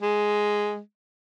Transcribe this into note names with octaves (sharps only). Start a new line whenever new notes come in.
G#3